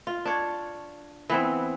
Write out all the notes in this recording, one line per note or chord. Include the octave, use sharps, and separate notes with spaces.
F4
D4 C#5
E3 B3 C4